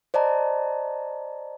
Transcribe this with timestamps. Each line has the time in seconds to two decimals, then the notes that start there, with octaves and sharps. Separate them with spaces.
0.14 C5 D5 D#5 A5 A#5